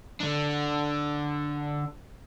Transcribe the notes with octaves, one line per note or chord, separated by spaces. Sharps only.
D3 D4